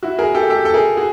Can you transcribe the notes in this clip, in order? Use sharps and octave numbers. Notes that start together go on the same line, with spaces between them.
E4 F#4
G#4 A#4
G4 A4
G4 A4
A4
G#4 A#4
F#4 G#4